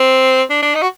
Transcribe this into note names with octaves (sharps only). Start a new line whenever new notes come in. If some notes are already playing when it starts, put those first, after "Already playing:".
Already playing: C4
D4
D4
D#4
F#4